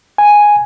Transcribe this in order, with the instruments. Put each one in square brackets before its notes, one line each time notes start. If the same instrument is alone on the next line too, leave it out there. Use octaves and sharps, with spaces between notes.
[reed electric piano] G#5